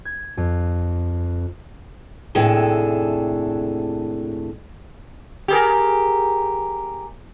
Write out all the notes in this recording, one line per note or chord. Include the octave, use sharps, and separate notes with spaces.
G#6
F2
D#2 A2 C3 D4 G#4 A4
G4 G#4 A#4